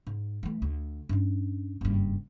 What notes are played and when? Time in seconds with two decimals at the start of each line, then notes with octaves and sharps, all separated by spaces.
0.07 G#2
0.43 E3 A3
0.62 D2
1.09 G2 C#4
1.81 F#1 G2